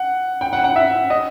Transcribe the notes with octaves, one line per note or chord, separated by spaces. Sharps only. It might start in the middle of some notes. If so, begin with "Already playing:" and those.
Already playing: F#5
G5
F#5
F#5
E5
D#5